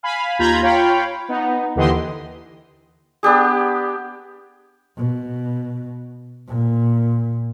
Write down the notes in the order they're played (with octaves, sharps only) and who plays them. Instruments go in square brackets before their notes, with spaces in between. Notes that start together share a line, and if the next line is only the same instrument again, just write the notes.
[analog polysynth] F5 G#5 B5
D#2 F4 A#5 B5 G6 G#6
F4 C#5 F5 G5 B5
B3 D#4
D#2 D3 E3 G4 D#5 C6
[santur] B3 D4 G4 G#4
[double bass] B2
A#2